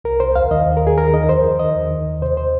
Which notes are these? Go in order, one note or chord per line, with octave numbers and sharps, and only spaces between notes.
C2 A#4
C2 C5
D#2 F5
D#3 D#5
D#2
A#4
D#2 G#4
D#3 A#4
D#3 D#5
F2 C5
F2
D#3 D#5
D#2
D#3
D#2
C3 C5
C5